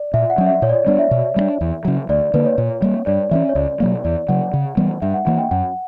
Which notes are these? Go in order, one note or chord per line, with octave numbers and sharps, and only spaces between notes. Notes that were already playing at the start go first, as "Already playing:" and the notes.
Already playing: D5
A#2 E5
F#5
F#3 C#4
E5
A#2 C#5
D5
C#5
G3 B3 D4 D5
E5
B2
G3 B3 D4
E2
C#3 F#3
D2 D5
D3 A#3 B4
C#5
A#2
G3 A#3
G2 D5
E3 A#3 C#4 E5
C#5
C#2 D5
B2 F#3 A#3
E2 D5
C#3 F#3 F#5
C#3
E3 G3 B3
G2 E5
F#5
E3 A#3 F#5
G5
F#2 F#5